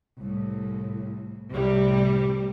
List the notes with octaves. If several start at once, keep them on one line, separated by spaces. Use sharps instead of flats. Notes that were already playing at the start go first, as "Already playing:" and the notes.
C2 A2
C2 A2 C3 G3